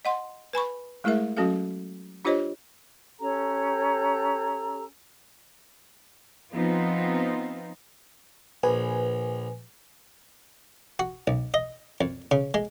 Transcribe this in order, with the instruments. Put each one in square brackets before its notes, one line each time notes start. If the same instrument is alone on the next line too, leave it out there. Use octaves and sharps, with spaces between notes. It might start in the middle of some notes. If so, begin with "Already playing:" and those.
[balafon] D#5 F#5 C6
B4 G#5 B5 C#6
G#3 A3 E4 G#4 A#4 E5
F#3 C#4 F#4 A4 F5
D4 F4 G4 C5 C#5 D#5
[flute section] C#4 G4 A4 A#5
[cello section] F3 B3 C4 D#4 F4
[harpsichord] A#1 [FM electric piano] B4 G#5
[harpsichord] F#4
B1
D#5
F2
C#3
G#3